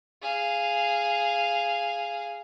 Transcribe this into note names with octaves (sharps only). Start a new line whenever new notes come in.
G#4 F5